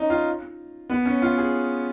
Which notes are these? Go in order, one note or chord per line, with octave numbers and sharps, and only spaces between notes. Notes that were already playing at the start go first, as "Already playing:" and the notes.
Already playing: C#4 D#4
F4
B3
C#4
F4
G#4